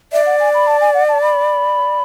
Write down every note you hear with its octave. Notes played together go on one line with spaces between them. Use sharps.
D5 E5
F#5
G#5
B5
A5
G#5
F#5
A5
B5